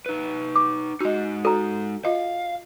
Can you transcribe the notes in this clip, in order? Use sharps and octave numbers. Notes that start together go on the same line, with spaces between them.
D#4 B4
D6
G#3 D#4 F#4 D#5
F#4 A4 A#5
F4 D#5 F5